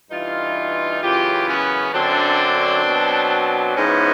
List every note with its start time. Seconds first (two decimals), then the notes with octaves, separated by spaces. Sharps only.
0.11 G2 E3 D#4 F4
1.02 F#2 C#3 E3 F4 G4
1.48 B3 C#4
1.94 F#2 D3 F#3 C4 D4
2.86 B2 F#3
3.77 G#2 E3 B3 C#4